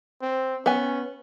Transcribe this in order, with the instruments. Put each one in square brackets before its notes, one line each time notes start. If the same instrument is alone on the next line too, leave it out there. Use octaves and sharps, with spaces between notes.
[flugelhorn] C4
[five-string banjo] B3 G#5 [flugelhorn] C#4